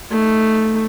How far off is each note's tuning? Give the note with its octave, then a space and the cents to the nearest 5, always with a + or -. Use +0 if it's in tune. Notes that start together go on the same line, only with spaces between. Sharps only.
A3 +0 D#4 +15